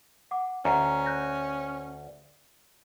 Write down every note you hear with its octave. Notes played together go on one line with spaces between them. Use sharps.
F#5 D6
D2 C#4 F#5 A#5
F#6 G6 A#6